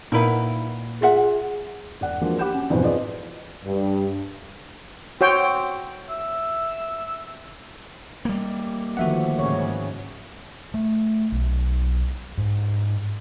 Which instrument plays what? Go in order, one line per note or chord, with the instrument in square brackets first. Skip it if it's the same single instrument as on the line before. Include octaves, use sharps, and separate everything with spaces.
[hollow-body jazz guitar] A#2 A#4 B4 [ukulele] D#4 E4 F#5
[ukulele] F4 E5 F#5 [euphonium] G#4
[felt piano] E1 D5 F#5
E3 F3 G#3 A#3 D4 F#4
G4 F#5 B5 G6 E7
C#4
F2 G#2 B2 E3 C4
F4 G#4 B4 D5 D#5
[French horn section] G2
[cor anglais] C4 [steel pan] F#4 C#5 G5
[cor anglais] E5
[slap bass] G3 A#3
[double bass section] D2 [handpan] D#3 F3 B3 [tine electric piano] F#4 E5 F#5
[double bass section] G#2 C#3 [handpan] C#5
[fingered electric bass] A3
B1
G#2